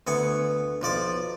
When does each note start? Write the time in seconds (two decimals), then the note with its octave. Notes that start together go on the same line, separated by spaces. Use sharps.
0.07 D2 B3 G#5 C#6
0.82 B1 F3 D5 D6